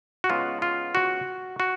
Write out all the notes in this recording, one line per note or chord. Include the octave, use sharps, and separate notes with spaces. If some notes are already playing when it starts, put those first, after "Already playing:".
F#4
C#3 G#3 B3 F4
F4
F#4
F#4